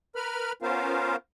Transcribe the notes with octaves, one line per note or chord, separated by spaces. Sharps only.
A#4 B4 B5 F6
B3 C#4 F4 A#4 C5 F5